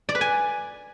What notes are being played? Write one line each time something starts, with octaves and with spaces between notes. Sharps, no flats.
D5
B4
G#5